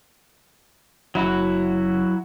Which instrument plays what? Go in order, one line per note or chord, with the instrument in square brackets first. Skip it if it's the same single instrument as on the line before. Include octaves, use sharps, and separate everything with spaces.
[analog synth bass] F#1 [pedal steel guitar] F#3 E4 F#4